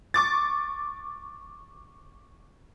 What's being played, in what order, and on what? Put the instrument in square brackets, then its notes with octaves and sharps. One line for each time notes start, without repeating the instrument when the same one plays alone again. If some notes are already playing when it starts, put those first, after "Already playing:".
[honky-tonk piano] C#6 D6 A6